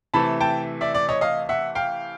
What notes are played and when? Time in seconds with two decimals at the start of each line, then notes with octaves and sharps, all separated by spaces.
0.14 C3 E3 A3 A5 B5
0.41 G5 A5
0.81 D5 E5
0.94 D5
1.09 C#5 D#5
1.21 D#5 F5
1.49 E5 F#5
1.75 F5 G5